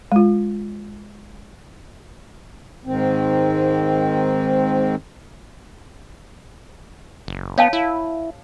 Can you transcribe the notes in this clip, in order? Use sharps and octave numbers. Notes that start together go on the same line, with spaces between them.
G#3 F4
G#2 D#3 C4
F#1
B3 C#5 F5 A5
E4